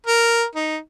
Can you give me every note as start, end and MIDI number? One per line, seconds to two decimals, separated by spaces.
0.07 0.44 70
0.56 0.77 63